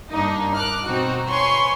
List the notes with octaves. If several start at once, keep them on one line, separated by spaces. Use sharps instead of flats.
G2 A#3 D4 D#4
D6 F6 F#6
B2 C4 D#4 F#4
B4 C#5 G#5 C6 C#6